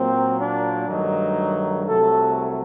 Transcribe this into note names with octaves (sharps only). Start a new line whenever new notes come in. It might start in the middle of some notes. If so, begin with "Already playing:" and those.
Already playing: A#2 F#3 A#3 C4
D4
G2 D#3 F#3 A3 D#4
C2 C3 F#3 A3 A4